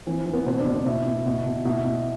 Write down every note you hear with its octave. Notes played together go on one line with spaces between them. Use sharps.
E3 C4
E3
B3
B2 C4
D4
B2
C4
B2 E4
B2
B2
B2
B2 E4
B2